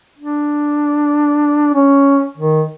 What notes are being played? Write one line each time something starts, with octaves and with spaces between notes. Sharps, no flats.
D4
C#4
D#3